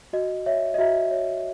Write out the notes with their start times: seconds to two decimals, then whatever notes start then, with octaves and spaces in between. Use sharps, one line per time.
0.13 F#4 D#5
0.46 C#5 E5
0.74 D#5
0.78 F#4 E5
1.11 C#5